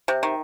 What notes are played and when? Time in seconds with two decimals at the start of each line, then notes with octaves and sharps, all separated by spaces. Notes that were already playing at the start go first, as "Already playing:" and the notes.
0.08 C3
0.23 D#3